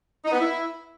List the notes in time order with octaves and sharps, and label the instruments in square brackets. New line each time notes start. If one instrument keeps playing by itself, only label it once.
[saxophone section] D#4
B3
E4